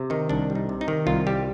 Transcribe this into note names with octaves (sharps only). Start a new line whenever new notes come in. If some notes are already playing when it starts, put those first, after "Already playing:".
Already playing: C3
D#3 D#4
C2 D4
G3
D#4
C3
D#4
D#3
C2 F4
G3 G4